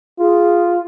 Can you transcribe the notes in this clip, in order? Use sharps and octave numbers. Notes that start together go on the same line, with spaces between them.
F4 G#4